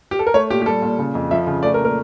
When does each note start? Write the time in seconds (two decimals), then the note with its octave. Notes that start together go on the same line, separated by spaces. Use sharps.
0.11 G4
0.19 A4
0.27 A#4
0.34 A3 C#5
0.50 A#2 G4
0.62 G4
0.66 G3 A4
0.82 A#2
0.99 C#3
1.15 F2
1.31 F3 E5
1.47 C#3
1.63 A3 D5
1.74 A#4
1.79 A#2
1.85 A#4